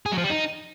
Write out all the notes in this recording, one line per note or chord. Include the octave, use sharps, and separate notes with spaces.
G#4
F#3
F3
G3
D#4